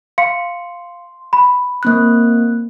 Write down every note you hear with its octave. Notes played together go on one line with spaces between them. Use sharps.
F5 C6 C#7
B5
A#3 C4 F#6